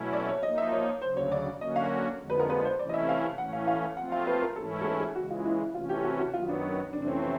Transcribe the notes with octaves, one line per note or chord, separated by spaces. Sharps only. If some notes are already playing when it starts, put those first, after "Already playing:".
Already playing: B2 F#3 A3 C#4 E4
D5
C#5
F3 A#3 D#4 D#5
E5
C#5
D2 C#3 F#3 C5
C#5
D5
D3 F#3 A#3 C#4 F#4 D#5
F5
F2 D3 F3 G#3 B3
B4
A#4
B4
C5
C3 E3 A3 C#4 E4 D5
D#5
E5
F5
A2 E3 A3 C#4 F#5
F5
F5
F3 A3 C4 F4 F#5
F5
B4
A#4
G#2 E3 A3 C#4 E4 A4
A4
G#4
G#4
C#3 E3 G#3 F#4
F4
E4
C3 E3 A3 C#4 F4
G4
F#4
F#4
F#2 D#3 F#3 B3 F4
D4
F2 C3 E3 A3 C4 D4
D4
C#4
C#4